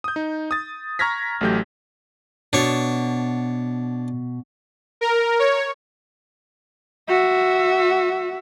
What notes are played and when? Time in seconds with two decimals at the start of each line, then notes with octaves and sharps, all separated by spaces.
0.04 D#6 G6
0.16 D#4
0.51 D#6 A6
0.99 A#5 C#6 F6 G#6 A#6 B6
1.41 A1 F#3 A3 G4 G6
2.53 B2 D4 C#5
5.01 A#4
5.39 C#5
7.08 F#4 E5